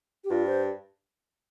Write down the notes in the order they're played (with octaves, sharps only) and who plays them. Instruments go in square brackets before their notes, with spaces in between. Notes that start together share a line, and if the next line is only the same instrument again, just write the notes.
[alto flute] G4
[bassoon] G2 [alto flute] F4
[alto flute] C5